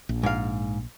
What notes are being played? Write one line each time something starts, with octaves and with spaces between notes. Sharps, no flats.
A#1
G#2 F5